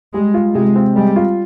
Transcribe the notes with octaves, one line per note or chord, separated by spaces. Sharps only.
G3 G#3
F4
C3 G#3
C4
G3 G#3
F4